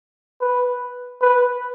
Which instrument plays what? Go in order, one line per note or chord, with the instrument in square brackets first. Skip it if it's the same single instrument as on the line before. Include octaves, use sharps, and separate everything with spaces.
[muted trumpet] B4
B4